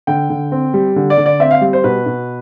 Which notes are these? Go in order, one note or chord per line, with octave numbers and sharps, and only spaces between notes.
D3 G5
D3
C4
G3
D3
D5
D3
D5
C4 E5
F5
G3
C5
B2 B4
B2